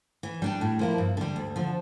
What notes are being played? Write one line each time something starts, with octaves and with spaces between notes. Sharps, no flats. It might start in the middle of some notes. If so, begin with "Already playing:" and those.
E3
G3 D4 G4
A2
F3 A#3 E4
G2
D3 G3
D2
D3 F3